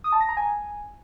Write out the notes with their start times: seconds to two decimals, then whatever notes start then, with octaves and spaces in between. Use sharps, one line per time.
0.04 D#6
0.12 A5
0.21 A#6
0.29 A#5
0.37 G#5